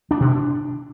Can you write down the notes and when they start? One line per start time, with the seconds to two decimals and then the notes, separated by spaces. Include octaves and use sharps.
0.11 D4
0.20 B2
0.30 D4